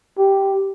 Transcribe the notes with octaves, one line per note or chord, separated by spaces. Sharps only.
G4